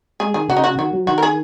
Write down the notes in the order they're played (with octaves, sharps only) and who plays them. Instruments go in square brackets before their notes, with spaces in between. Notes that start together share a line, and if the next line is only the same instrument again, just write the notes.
[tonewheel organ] G#3 [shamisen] G#4
[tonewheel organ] D#3 [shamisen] G#4
[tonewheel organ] C#3 [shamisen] F#4
[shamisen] D#4
F#4
[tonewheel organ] D#3 [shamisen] F#4
[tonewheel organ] F#3
[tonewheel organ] D#3 [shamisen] F#4
[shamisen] A#4
G#4